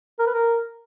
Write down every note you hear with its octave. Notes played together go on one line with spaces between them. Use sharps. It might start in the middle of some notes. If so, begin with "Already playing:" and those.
A#4
B4
A#4